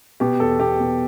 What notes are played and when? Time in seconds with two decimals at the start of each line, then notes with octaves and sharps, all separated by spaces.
0.20 B2 G4
0.40 E2 A4
0.60 B2 G4
0.80 B2